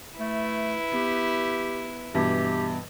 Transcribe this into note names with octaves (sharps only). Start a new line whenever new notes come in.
A3 E4 B4
B3 G4
G2 B2 E3 G4